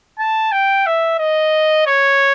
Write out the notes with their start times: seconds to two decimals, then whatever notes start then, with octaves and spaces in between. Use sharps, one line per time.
0.19 A5
0.52 G5
0.86 E5
1.19 D#5
1.87 C#5